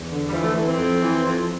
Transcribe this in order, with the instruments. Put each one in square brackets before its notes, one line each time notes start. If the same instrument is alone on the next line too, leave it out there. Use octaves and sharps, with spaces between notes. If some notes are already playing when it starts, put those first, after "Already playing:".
Already playing: [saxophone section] E2
D3
G3
E3 F3
A3
E3
C4
F2
E3
F2